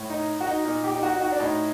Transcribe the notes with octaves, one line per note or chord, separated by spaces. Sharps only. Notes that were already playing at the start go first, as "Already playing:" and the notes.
Already playing: A2
D#4
F#4
D#4
A#2 D#4
G4
D#4
F#4
D#4
F#4
D4
A2 D#4